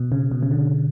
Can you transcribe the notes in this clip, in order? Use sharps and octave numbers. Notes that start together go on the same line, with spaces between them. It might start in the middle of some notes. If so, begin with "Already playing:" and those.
Already playing: B2
C#3
B2
C#3
D3